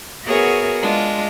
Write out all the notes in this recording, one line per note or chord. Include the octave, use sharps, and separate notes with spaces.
B3 F#4 G#4 A#4 C#5 E5
G#3 D4 F4